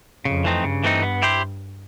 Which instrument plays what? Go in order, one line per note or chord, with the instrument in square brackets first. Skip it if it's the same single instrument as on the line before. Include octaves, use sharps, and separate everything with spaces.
[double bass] F2 [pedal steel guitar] C#3
[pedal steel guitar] E3 A3 C4 D#4
[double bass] G2 [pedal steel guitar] C#3
[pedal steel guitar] E3 A3 C4 D#4
B3
E4 G4 C5